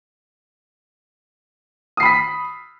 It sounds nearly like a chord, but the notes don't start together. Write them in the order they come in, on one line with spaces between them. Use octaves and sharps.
D#6 C7 B5 B6